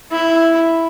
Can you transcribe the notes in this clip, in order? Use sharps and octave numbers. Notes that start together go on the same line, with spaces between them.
E4